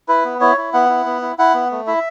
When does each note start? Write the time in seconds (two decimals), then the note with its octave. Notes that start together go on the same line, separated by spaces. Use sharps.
0.08 E4 B4
0.25 B3
0.41 E4 C#5
0.57 E4
0.73 B3 F#5
0.89 E4
1.06 B3
1.22 E4
1.38 E4 F#5
1.54 B3
1.71 A3
1.87 E4 E5